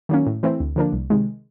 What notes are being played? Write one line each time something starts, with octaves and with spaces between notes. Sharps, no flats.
D#3 F#3 A#3 C#4
A2
E3 A3 C4 E4
D2
D3 F3 A#3 D4
C2
C3 D#3 G#3